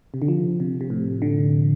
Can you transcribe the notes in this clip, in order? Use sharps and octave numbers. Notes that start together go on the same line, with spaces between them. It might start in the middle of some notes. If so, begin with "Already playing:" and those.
C3
D3
F3
C3
C3
A2
D3